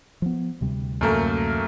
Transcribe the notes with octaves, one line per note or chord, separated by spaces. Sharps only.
F3 B3
D2 C3 G3
F#2 A3 A#3